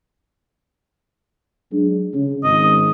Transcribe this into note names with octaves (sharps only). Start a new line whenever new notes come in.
F#3 G#3 D4
C#3
G#1 D#5